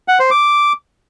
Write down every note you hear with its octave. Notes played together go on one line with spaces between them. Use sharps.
F#5
C5
D6